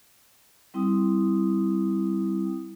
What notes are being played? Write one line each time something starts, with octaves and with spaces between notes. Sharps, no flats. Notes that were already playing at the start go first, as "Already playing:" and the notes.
G3 C4 E4 G5 D#6